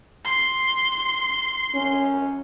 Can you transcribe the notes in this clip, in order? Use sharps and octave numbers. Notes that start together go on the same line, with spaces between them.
C6
C#4